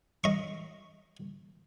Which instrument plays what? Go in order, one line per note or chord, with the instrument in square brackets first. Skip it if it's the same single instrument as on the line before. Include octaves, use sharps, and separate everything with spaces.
[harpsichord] D#5 C#6